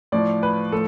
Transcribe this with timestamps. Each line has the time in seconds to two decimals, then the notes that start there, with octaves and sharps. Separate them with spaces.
0.12 A2 F3 D5
0.43 B4
0.72 A2 F3 A4